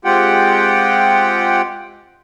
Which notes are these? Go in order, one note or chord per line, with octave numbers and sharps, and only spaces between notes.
G#3 C4 F4 G4 F#5 G5